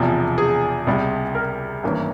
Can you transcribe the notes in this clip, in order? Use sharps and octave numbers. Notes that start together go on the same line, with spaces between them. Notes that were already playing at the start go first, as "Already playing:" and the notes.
Already playing: E1 E2 C3 F3 G#4
G#4
C#2 C3 G3
A#4
G#1 G2 E3 A#3 C#4